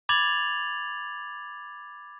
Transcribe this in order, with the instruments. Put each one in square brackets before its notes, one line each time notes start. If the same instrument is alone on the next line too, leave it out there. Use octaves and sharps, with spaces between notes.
[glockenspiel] B5 D6 G#6 A6 F7 F#7